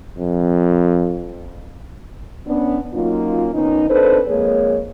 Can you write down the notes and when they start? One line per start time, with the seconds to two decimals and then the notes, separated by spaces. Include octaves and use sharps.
0.18 F2
2.47 B3 C#4 D4
2.94 F#3 A#3 C#4 D#4 F4
3.54 D#3 B3 C#4 D#4
3.90 C4 D4 D#4 A4 B4 C5
4.28 F2 G#3 A#3 G#4 C#5